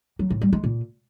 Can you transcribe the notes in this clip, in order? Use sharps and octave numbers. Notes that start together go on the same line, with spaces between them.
F#3
A2
G3
G#3
A#2